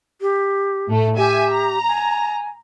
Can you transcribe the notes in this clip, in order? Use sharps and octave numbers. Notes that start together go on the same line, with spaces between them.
G4
A2 A3
G4 E5 G#5
A#5
G#5